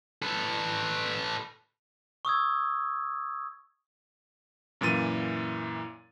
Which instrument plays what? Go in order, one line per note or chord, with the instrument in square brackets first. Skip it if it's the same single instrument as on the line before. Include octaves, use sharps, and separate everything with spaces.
[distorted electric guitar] A4 B4
[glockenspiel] C#6 D#6 E6 G#6
[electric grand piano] F#2 A#2 E3 A6 D#7